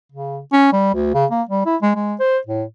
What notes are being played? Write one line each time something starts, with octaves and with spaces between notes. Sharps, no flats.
C#3
C#4
G3
D2
C#3
A#3
G3
E4
G#3
G#3
C5
A2